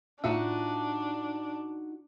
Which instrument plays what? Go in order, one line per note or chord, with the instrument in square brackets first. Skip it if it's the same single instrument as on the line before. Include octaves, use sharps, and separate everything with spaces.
[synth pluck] A2 F4 E5 [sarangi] D4 [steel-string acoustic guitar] D#4 F#4 A5